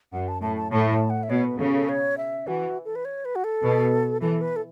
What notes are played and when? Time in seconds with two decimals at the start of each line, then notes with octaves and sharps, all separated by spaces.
0.13 F#2 F#5
0.28 A5
0.42 A2 A5
0.57 A5
0.71 A2 A5
0.91 A5
1.10 F#5
1.23 E5
1.30 B2 C#5
1.44 B4
1.59 C#3 A4
1.74 A4
1.89 C#5
2.18 E5
2.47 E3 F#4
2.85 A4
2.95 B4
3.05 C#5
3.25 B4
3.35 F#4
3.44 A4
3.64 B2
4.21 E3 A4
4.41 B4
4.56 A4